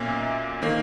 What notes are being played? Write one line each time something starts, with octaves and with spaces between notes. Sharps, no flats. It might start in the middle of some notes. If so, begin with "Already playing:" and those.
Already playing: B1 A#2 A#3 C#4 E5
D#3 A#3